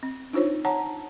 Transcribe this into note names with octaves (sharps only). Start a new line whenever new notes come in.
C4
D4 D#4 F4 C5 C#5
C#5 F#5 A5 A#5